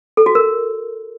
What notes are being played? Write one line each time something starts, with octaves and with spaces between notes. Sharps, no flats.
A4
F#4
A#4